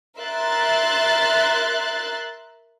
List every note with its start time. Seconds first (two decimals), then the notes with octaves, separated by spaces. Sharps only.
0.18 A#4 E5 C6 F#6 A6